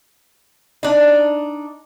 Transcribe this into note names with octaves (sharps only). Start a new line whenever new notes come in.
D4 D#4